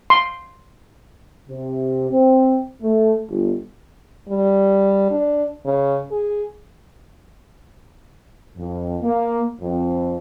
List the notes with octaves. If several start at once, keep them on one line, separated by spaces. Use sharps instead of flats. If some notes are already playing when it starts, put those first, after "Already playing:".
C6
C3
C4
A3
G1
G3
D4
C#3
G#4
F2
A#3
F2 C4